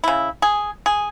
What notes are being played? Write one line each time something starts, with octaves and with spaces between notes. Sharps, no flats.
C#3 E4
G#4
G#4